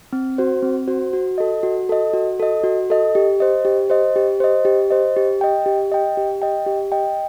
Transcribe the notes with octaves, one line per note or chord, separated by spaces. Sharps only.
C4
F#4 C5
C4
F#4 C5
F#4
A4 D#5
F#4
A4 D#5
F#4
A4 D#5
F#4
A4 D#5
G4
C5 D#5
G4
C5 D#5
G4
C5 D#5
G4
C5 D#5
G4
D#5 G5
G4
D#5 G5
G4
D#5 G5
G4
D#5 G5